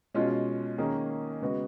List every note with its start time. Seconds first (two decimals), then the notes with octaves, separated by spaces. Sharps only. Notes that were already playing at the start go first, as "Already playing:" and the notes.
0.15 B2 G#3 C#4 F4
0.78 D#3 A#3 C#4 G#4
1.42 C#3 G#3 B3 F#4